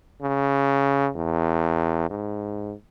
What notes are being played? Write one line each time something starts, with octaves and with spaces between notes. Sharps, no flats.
C#3
E2
G#2